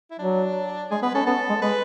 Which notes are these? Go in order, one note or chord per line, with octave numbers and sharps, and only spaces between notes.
E4
F#3 D4
G#3 G#4
B3 B4
C#4 A4
B3 A4
G#3
G#3 B4